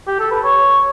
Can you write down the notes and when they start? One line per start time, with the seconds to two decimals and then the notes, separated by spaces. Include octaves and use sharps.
0.07 G4
0.19 A4
0.31 B4
0.44 C#5